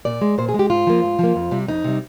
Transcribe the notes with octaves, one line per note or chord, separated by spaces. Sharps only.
A#2 D5
G#3
A#2 C5
G#4
G#3
G4
G#2 F4
F3 A#3
G#2
F3 A#3
F2
C3 G3
F2 D#4
C3 G3